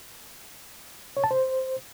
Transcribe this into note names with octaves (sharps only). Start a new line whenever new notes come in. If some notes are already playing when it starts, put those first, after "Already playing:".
C#5
A5
C5